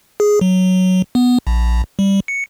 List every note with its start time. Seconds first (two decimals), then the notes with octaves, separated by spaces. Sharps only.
0.20 G#4
0.41 F#3
1.15 B3
1.47 A#1
1.99 G3
2.28 C#7